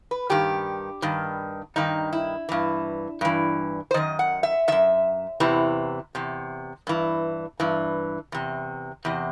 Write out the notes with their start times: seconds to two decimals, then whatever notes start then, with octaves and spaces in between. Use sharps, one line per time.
0.11 B4
0.30 G2 D#3 G4
1.02 G2 D#3
1.76 G2 D#3 D#4
2.13 E4
2.49 G2 E3
3.21 G2 E3
3.91 C5
3.94 F#2 D#3 D#5
4.19 F#5
4.43 E5
4.68 F#2 D#3 E5
5.40 E2 C3 E3
6.15 E2 C3
6.87 G2 E3
7.60 G2 E3
8.32 E2 C3
9.05 E2 C3